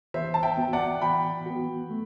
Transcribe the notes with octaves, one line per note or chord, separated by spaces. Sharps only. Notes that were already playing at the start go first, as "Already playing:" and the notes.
E3 C5 E5
A5
E5 G5
B3 F#4
D5 F#5
E3 G5 B5
B3 F#4
A3